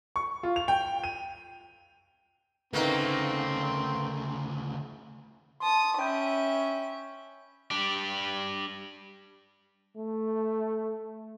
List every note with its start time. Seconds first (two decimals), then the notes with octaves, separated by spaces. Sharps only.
0.16 C#6
0.43 F4
0.56 F7
0.68 G5
1.04 D#7
2.73 D2 C#3 A3 A#3 C4 D#4 B4
5.60 A5 C6 D#6
5.99 C#4 E5 G5 B5 G6
7.70 G3 D4 G4 D5
9.97 A3